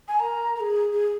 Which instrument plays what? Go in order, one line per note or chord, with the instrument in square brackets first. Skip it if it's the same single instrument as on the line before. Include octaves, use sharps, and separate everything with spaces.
[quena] G#5
[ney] A#4 [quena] A#5
[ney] A#4
G#4
G#4